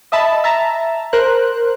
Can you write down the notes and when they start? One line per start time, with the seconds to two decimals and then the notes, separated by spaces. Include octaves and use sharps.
0.12 D#5 E5 A5 B5
0.44 E5 A5 A#5
1.13 A#4 C5 F#6